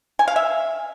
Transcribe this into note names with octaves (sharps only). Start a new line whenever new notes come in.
G#5
F5
E5